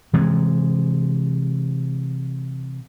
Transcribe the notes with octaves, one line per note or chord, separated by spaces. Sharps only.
C3 E3 G#3